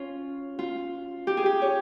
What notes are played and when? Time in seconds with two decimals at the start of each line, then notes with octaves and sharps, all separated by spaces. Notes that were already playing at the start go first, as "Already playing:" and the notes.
Already playing: C#4 F4
0.59 F4
1.27 G4
1.37 G#4
1.46 G4
1.62 C#5